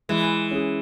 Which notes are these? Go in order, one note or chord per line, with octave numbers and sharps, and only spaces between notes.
E3 G#3
C#4 G#4